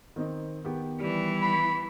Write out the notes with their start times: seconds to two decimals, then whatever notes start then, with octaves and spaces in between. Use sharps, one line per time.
0.16 D#3 C4 D#4
0.64 D#3 B3 G4
1.01 E3 G3
1.42 B5